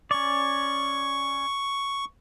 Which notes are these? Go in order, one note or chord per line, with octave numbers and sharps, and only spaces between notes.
C#4 D5 C#6